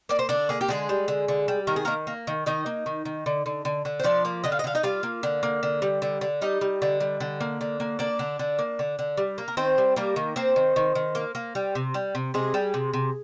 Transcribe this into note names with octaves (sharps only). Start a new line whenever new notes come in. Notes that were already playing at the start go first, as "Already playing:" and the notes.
A#3 D5
C5
D3 D4 D5
A#3 G#4
G4
D3 G#3 G#4
G3
D3
D3
G3
D#3 A#4
G#4
D#3 A#3 A#4
A#3
D#3
D#3 D#4 D#5
A#3
D#3
D#3
D3
D3
D3
D3
C5
F3 D4 D5
A#3
D3 D#5
F5
D#5
D3 F5
D#4 D#5
G3 F4 F5
A#3
D3
A#3
D3
G3
D3
D3
G3 D#4 D#5
G3
D3
G3
D3
A#3
D3
A#3
A#3 D4 D5
D3
D3
A#3
D3
D3
G3
A#3
A#4
D#3 C4 C5
G3
G3 A#3 A#4
D#3
A#3 C4 C5
D#3
D#3
D#3
A#3
A#3
G3
C3
G3
C3
C3 G#3 G#4
G3
C3
C3